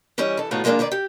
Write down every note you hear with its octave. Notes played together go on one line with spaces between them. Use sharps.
E3 G3 C#4 D#5
E3 A4
A2 D#3 B3 F4 F#4
F3 G#3 A#3 C4 D4 F4
D#3 A#3 B4 D5
G4